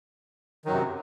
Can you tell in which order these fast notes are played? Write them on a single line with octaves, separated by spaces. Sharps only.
D#3 F#3 F#2 C3